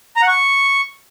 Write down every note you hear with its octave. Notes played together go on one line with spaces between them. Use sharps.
A#5
F#5
C#6